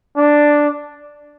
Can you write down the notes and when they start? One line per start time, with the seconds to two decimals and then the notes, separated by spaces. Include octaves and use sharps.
0.17 D4